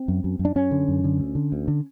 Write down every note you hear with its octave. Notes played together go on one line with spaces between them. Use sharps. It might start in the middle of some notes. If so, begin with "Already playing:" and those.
Already playing: C4
F#2
F#2
F#2
D4
F#2 C#4
D3
F#2
D3
D2
D3
D2
D3